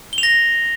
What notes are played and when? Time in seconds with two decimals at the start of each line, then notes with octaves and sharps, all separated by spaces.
0.13 G7
0.18 F7
0.23 A#6